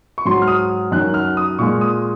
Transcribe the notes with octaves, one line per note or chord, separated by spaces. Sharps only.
C#6
G#2 F#3 C6
F6
D#6
F#2 D#3 F#3 F#6
F6
D#6
A#2 G#3 C#6
D#6